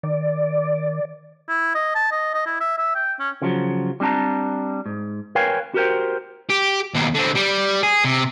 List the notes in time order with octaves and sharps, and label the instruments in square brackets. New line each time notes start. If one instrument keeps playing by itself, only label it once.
[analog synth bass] D#3 [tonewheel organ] D5
[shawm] E4
D#5
A5
D#5
D#5
E4
E5
E5
G5
C#4
[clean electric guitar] C#3 F3 F#3
G3 C4 D4 A5 A#5
G#2
A#4 B4 C#5 F5 G5 G#5
F#4 G4 A#4 C5 G5
[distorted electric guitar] G4
D#2 B2
D3 C4
G3
G#4
C3